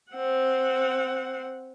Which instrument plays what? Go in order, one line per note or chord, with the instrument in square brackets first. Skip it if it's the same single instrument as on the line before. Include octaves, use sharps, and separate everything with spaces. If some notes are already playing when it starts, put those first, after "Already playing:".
[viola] C4 F#5